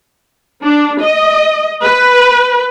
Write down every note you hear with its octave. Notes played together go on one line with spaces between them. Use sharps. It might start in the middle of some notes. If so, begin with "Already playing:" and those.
D4
D#5
B4